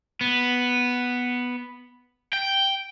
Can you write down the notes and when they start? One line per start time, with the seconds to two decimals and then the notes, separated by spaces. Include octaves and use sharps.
0.21 B3
2.33 G5